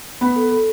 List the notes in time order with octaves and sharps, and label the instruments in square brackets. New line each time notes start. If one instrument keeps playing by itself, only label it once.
[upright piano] B3 [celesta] B5
[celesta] A4
A4